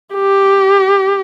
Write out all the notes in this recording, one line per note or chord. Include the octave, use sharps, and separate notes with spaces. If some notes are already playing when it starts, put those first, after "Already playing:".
G4